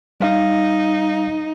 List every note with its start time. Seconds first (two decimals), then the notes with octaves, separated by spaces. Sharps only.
0.20 G3 D#4 F5